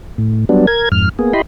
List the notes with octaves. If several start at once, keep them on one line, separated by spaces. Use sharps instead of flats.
A2
F#3 G3 B3 D4
A#4 G#6
F2 G#2 F6
A#3 B3 G#4
E4 G4 D#5 B5 C6